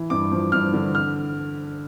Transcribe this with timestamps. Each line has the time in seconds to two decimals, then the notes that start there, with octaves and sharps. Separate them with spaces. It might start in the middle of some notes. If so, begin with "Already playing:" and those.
Already playing: E3
0.10 G2 D6
0.32 F3
0.52 G2 F6
0.74 D3
0.95 F6